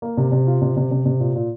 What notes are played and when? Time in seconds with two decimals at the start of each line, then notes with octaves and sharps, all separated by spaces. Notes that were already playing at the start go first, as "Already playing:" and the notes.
0.02 A#3
0.17 C3
0.32 C3
0.47 F4
0.62 C3
0.77 C3
0.91 C3
1.06 C3
1.20 A#2
1.35 A#2